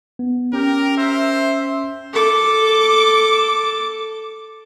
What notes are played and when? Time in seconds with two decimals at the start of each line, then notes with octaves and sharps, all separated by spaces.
0.19 B3
0.53 C#4 G4 A#4
0.98 C5 E5
2.13 A4 D6